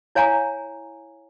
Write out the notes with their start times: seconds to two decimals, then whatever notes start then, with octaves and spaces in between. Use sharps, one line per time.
0.15 E4 C#5 F5 G#5 A#5